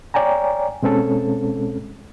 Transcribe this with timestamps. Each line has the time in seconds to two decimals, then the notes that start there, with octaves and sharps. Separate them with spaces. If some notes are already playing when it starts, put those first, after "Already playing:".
0.14 C#5 D5 G5 G#5 A#5
0.82 B2 G#3 C4 C#4 A4